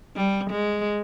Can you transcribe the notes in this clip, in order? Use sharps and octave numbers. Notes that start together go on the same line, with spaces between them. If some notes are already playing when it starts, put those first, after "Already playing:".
G3
G#3